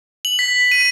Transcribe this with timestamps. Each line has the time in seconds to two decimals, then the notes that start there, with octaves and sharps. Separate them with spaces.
0.25 F#7
0.39 B6
0.71 D#7